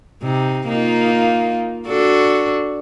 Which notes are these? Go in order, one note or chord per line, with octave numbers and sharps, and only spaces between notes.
C3 D#4
A#3 D#4 F4
D4 F#4 A4